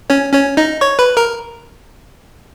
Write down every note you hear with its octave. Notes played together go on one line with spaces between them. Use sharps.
C#4 C#5
C#4 C#5
D#4 D#5
C#5 C#6
B4 B5
A#4 A#5